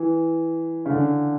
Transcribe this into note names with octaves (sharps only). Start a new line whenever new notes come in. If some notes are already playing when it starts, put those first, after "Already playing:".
Already playing: E3
C#3
D3